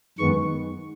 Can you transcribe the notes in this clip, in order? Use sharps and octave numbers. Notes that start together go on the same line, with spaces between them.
F#2 D#3 G#3 B3 C#6